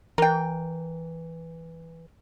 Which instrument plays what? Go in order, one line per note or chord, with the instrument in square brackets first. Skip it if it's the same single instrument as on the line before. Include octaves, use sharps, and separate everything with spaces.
[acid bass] E3 [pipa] A#4 G5